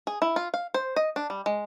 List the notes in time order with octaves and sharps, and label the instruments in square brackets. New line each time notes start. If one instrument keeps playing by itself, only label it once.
[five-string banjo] G#4
E4
F4
F5
C5
D#5
D4
G3
G#3